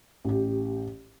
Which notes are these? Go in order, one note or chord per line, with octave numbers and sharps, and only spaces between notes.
A1 G4